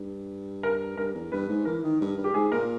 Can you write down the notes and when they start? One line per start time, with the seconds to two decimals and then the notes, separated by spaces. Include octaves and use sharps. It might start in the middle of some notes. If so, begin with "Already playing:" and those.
Already playing: G2
0.63 A#4
0.97 G2 A#4
1.14 E2
1.32 G2 B4
1.49 G#2
1.65 E3 A#4
1.83 D#3
2.01 G2
2.17 G2
2.24 G4
2.34 G#2 G#4
2.51 A#2 A#4